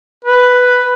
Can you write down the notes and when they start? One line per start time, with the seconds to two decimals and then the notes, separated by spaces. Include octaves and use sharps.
0.25 B4